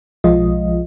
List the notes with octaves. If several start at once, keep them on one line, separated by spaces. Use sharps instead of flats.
B1 F3 G#3 F4 D#5